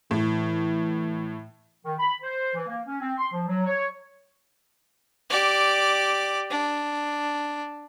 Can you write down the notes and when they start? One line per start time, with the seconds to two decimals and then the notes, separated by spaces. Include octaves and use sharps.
0.11 A2 E3
1.85 D#3
1.98 B5
2.23 C5
2.55 E3
2.67 A#3
2.87 C#4
3.01 C4
3.18 C6
3.32 F3
3.47 F#3
3.66 C#5
5.30 G4 D5
6.50 D4